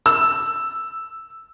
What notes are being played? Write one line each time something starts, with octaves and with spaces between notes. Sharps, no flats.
E6